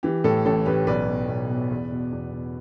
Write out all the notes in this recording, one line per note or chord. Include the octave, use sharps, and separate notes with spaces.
E3 G4
A2 A4
A1 A4
A1 G4 B4
B1 B4 D5
B2
B1
B2
E2
B2
E2
B2